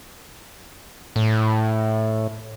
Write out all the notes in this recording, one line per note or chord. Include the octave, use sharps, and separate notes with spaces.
A2